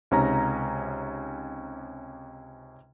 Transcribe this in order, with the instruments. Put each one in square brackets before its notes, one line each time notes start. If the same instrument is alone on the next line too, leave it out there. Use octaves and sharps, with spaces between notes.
[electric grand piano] C#2 C3 C#4 D#4 A#5